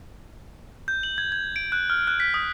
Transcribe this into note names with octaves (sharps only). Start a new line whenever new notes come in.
G6
F#7
G#6
G#6
D7
F#6
F6
F#6
B6
D#6